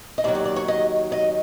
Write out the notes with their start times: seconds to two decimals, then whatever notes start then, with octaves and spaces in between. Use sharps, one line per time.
0.18 D#5
0.24 D#2 D#3 F#3 D5
0.35 D5
0.45 D5
0.56 C#5
0.68 D#5
1.12 D#5